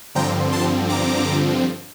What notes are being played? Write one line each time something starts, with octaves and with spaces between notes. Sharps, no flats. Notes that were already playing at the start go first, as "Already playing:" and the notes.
G2 D3 F3 C4 G5 A#5
A5 C6
A#5 D6